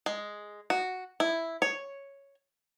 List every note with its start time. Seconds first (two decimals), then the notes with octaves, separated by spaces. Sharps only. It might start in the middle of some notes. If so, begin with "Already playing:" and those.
0.06 G#3
0.70 F#4
1.20 E4
1.62 C#5